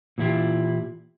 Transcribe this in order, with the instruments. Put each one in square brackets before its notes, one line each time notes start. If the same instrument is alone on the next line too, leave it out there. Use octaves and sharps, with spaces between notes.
[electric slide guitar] A#2 E3 F#3 E4 F4 G4